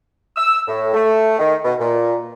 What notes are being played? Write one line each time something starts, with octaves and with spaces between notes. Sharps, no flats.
E6
A2
A3
D#3
B2
A#2